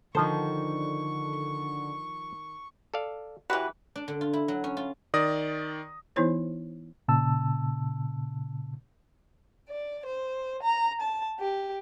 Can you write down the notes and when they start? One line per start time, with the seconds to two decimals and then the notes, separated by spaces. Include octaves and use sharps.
0.15 D3 D#3 F3 A4 C5 C#6
2.94 A4 D5 F5
3.50 E3 F#4 G4 B4
3.96 D4
4.08 D3
4.21 F4
4.33 E4
4.48 F#3
4.64 C#4
4.77 F4
5.14 D#3 D5 D#6 A#6
6.16 E3 B3 D#4 E4 C5 C#5
7.08 A#2 C#3 A5 E6
9.69 D5
10.05 C5
10.62 A#5
11.02 A5
11.39 G4